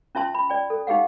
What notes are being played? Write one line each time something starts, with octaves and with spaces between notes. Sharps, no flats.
C#4 F4 E5 A5 C6
B5
D5 G5
A4
D#4 G4 G#4 F5 F#5